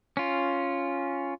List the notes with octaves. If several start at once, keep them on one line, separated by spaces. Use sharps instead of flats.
C#4 F4